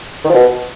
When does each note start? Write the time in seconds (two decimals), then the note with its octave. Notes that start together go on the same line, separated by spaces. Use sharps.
0.24 D#3
0.29 F3
0.34 B2